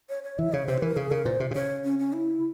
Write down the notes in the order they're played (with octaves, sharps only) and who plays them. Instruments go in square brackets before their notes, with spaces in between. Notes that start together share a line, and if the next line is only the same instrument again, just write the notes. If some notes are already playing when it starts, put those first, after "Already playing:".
[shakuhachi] C#5
C#5
[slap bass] E3 [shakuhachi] E5
[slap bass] C#3 [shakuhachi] C#5
[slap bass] C3 [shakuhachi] C5
[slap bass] E3 [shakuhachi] A#4
[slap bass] C#3 [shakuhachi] G#4
[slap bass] C#3 [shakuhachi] A#4
[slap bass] A#2 [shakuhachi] C5
[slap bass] C3
C3
[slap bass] C#3 [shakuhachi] C#5
[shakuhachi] C#4
C#4
E4